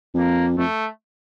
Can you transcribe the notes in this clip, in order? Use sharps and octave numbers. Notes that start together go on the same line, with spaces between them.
F2 A#3
F2 A3